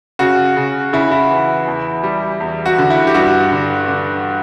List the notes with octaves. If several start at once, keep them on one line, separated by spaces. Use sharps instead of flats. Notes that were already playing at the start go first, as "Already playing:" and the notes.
C#3 F#4
C#3
C#3 E4
E4
E3
E2
G3
E2
F#4
D3
E4
G4
G2 F#4
D3
D3